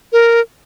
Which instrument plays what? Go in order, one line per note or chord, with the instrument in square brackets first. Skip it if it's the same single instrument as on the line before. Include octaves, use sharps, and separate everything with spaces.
[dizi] A#4